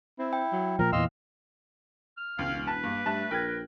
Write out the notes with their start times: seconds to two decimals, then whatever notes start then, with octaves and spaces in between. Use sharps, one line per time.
0.19 C4 E4
0.33 G5
0.52 F#3
0.79 A#2 F3 A#4
0.93 E2 A#2 E3 D#5 F5 C6 E6
2.17 F6
2.39 E1 C#2 F5
2.67 B4 A5
2.83 G2 A#3
3.06 G2 A3 A5 F#6
3.31 A#1 A#4 G5 F#6 G#6